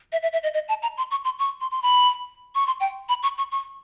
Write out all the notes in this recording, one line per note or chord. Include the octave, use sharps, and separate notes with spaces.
E5
E5
E5
D#5
D#5
A5
A#5
C6
C#6
C6
C#6
C6
C6
B5
C#6
C6
G5
B5
C#6
C#6
C#6